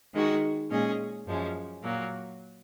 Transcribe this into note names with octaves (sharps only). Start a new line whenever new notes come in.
D#3 G#3 D#4 F#4
A#2 G#3 C#4 G#4 D#5
F#2 F3 G#3 C#4
A#2 F#3 A#3